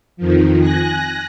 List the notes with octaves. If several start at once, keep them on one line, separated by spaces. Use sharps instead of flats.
F2 D#3 F3
G#5 F#6 A#6